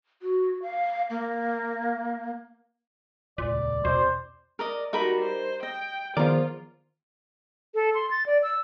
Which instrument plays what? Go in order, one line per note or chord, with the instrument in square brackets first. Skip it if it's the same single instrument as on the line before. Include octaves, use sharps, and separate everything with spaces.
[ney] F#4
F5
A#3
[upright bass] D#1 C#2 [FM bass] A#2 [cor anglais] D5
[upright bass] E2 C4 [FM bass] B2 [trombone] C5
[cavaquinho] A#4 D5 D#5
[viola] G3 F#4 [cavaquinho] D#4 A#4 B5
[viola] C5
[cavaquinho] D#5 [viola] G5
[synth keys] D#3 B3 G#4 [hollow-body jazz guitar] F3 D5 [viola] F4 [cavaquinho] A#4
[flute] A4
C6
A6
D5
E6